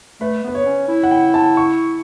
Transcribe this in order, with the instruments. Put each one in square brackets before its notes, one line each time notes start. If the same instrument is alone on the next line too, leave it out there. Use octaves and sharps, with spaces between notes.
[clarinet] A3 [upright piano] B4
[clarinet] B3 [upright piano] B4
[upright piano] C#5
[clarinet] C#4
E4
[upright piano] F#5
G5
A5
C#6